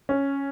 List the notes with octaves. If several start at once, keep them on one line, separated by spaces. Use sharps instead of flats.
C#4